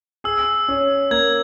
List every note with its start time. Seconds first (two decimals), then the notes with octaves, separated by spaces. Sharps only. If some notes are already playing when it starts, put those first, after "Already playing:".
0.24 G#4 E6
0.68 C#4
1.11 A#3 G#6